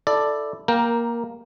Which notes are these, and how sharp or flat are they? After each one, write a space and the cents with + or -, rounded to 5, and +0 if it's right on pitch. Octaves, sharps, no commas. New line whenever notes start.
E4 +0 A4 +0 D5 +5
A#3 +10 A#4 +0 G5 +0